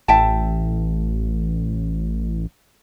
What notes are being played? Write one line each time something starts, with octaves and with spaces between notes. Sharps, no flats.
A1 E5 G5 A5